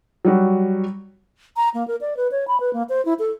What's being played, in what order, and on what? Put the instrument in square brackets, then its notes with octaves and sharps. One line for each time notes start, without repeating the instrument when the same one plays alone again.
[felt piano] F#3 G3 F#4
[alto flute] A#5
A#3
A#4
D5
B4
C#5
B5
B4
A#3
C5
E4
A4